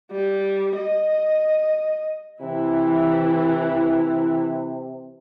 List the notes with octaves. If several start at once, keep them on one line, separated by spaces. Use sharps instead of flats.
G3
D#5
C3 E3 E4